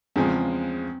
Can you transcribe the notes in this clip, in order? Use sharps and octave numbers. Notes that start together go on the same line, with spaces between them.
E2 C#3 F3 G#3 C4